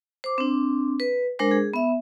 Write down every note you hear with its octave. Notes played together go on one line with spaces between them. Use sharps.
C5 D6
C4 D4
B4
G#3 D4 A#4 C5
G#4
B3 E5